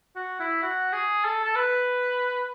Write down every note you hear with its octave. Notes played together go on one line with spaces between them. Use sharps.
F#4
E4
F#4
G#4
A4
A4
B4